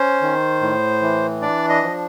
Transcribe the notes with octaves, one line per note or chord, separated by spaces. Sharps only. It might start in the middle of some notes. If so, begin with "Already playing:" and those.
Already playing: C#4 C5
D#3
A2
E3
D4 D5
D#5
F3